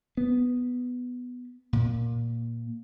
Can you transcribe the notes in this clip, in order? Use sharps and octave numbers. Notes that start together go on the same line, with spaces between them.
B3
A#2